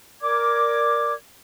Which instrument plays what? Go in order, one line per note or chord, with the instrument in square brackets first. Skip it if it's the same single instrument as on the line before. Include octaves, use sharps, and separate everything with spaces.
[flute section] A#4 D5 D6 G#6